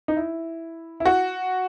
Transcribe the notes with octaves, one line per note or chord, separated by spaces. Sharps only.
D#4
E4
E4
F#4